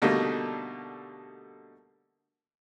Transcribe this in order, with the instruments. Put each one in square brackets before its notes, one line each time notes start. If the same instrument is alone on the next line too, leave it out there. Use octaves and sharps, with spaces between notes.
[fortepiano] B2 D3 G3 A3 A#3 D#4